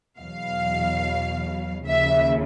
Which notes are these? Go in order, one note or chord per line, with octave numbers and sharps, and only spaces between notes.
E2 B2 F#3 F5
D#2 C#3 F3 E5